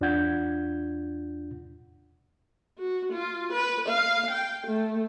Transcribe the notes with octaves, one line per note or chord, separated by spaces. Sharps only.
E2 D4 F4 F#5 G6 G#6
F#4
F4
B4
F5
G5
A3